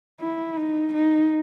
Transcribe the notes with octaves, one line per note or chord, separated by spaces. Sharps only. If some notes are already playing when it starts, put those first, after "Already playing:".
E4
D#4
D#4